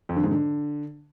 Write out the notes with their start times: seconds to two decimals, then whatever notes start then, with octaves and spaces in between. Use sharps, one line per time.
0.09 F2
0.16 D3
0.24 G#2
0.31 D3